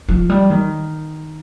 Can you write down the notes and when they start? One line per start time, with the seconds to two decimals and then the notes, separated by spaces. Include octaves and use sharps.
0.09 F3
0.29 G3
0.50 D#3